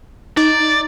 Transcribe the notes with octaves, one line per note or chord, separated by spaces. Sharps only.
D#4 D5